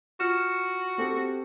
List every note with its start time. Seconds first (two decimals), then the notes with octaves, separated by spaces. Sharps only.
0.20 F4 F#4 F6 E7
0.98 C4 G4 A4